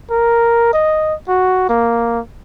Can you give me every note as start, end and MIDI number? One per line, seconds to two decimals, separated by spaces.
0.11 0.72 70
0.73 1.14 75
1.29 1.64 66
1.69 2.20 58